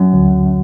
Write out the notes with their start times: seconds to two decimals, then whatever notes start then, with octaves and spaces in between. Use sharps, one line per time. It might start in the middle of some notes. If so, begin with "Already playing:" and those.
Already playing: F#2
0.14 D2